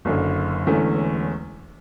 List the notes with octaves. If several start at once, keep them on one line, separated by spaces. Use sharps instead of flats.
F#1 F#2 D3
E1 E2 D3 A3 C#4